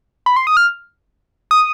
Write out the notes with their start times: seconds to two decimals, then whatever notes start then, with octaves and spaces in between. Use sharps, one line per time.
0.26 B5
0.36 C6
0.47 D#6
0.57 F6
1.51 D#6